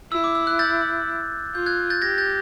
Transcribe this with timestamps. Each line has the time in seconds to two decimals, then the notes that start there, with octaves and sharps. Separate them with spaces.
0.12 E4 E6
0.24 D6
0.35 E6
0.47 F#6
0.59 G6 A6
1.54 F4 G6
1.66 F#6 G#6
1.90 G6 A6
2.02 G4 G#6 A#6
2.18 G6 A6